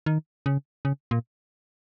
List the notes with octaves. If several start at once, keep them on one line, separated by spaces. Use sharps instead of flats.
D#3
C#3
C#3
A#2